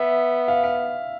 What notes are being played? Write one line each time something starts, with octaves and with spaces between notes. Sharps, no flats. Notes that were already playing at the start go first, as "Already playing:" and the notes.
Already playing: B3 E5
F5
F5